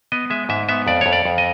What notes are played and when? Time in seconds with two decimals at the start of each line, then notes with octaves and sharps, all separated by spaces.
0.12 B3 D#5
0.30 G#3 E5
0.49 G#2 E5
0.69 B3 E5
0.87 F2 D5
1.01 F2 C#5
1.12 D5
1.25 F2
1.38 D#5